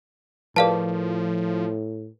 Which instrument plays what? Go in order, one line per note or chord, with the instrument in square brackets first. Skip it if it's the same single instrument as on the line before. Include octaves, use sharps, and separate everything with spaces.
[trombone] A2 [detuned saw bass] F3 [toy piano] G#4 A#4 B4 [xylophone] D5 F5 A5